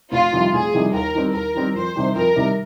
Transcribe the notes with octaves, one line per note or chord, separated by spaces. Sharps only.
F1 F4
F2 C3 D#3 G3
F1 G#4
F2 C3 D#3 G3
D#2 A#4
D#3 G3 C4
D#2 A#4
D#3 G3 C4
F2 C5
C3 D#3 G3
F2 A#4
C3 D#3 G3